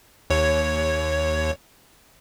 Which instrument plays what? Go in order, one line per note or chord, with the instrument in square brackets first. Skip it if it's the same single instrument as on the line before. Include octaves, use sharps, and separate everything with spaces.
[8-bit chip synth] D#2 C#5